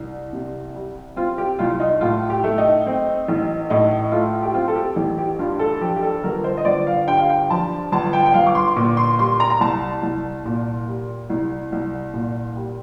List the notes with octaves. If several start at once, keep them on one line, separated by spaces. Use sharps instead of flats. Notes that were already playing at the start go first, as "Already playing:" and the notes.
Already playing: C2
C3
G3
C4 F4
G4
C2 F4
D#4
A2 F4
G4
A3
D#4
C4
A1
A2 D#4
A3 F4
G4
C4 F4
A4
G4
A1 G4
G4
G2 F4
A4
F3 G4
G4
A4
G1 A#4
C5
D#5
G1 D5
F5
G2 G5
F5
G5
F3 A5
G1 A5
G5
G5
G1 F5
D6
C6
A#2 D6
C6
G3 C6
A#5
A#5
C2 A5
C2
A#2
G3
C2
C2
A#2
G3